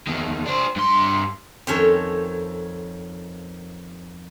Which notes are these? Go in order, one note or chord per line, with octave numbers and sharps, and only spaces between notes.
E2 D#3
D4 C5
G2 C6
F2 D#3 C4 C#4 A4 C#5